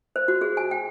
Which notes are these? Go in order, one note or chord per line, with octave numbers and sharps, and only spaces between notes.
C5
F#4
G#4
G#5
G5